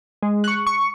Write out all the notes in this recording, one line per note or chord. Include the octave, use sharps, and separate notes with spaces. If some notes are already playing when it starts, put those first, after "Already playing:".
G#3
C#6 F#6
C#6